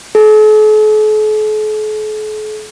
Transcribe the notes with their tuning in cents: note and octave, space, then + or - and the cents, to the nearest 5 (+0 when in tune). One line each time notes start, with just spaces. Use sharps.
A4 -45